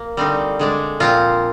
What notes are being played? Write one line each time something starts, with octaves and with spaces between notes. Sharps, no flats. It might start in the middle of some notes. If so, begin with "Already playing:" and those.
Already playing: A#3
D3 G3 C4 D#4
D3 G#3 D4
A#2 F3 C4 F4